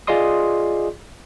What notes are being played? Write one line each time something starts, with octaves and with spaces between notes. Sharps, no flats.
F4 G#4 D5 D#5 C6 D#6